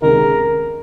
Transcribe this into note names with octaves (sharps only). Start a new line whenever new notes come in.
C#2 C3 D#3 A#4